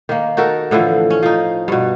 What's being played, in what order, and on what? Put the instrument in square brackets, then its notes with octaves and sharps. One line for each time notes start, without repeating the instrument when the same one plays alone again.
[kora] D#3 A#3
D#4 F#4 A4 A#4
A2 D3 E3 F3
C#4
F3 D#4
G2 B2